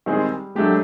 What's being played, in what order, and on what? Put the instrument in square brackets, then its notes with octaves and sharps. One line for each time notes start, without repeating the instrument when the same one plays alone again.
[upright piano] D#3 G#3 C4 D#4 G#4 [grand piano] G3
[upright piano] F#3 A3 D4 G4 [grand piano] G#3